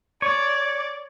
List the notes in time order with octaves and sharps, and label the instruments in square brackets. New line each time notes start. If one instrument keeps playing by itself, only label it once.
[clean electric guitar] C#5 [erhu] D5